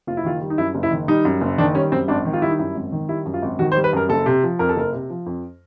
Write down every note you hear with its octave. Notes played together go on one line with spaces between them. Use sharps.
F#1 F4
E4
D#3 F4
G3
D#4
F#2 E4
F#1
E4
D#3
G3 D#4
F#2
F#1
D#3 D4
G3 C#4
F#2 C4
G#1 D4
D#3
F4
G3 E4
D#4
F#2 E4
G#1
D#3
G3 E4
F#2
F4
G#1
D#3 F#4
C5
G3
B4
F#2 A#4
F#1 A4
C3
F3
F2 A#4
A4
F#1 A#4
C3
F3
F2